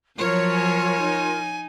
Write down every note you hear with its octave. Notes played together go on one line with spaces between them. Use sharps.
F3 F#3 F4 A#4 C#5
G#5
D#4